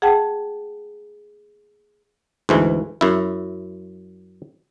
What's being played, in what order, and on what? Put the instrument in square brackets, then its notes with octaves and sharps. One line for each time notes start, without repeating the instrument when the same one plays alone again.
[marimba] G#4 F#5 G5 A5
[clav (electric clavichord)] D2 G#2 E3
F#2 E4